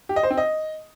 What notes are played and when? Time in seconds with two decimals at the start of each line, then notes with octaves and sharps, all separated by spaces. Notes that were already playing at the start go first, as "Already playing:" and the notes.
0.09 G4
0.16 D#5
0.23 C5
0.30 C4
0.38 D#5